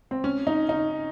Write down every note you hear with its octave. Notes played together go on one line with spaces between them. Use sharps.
C4
C#4
D#4
D#4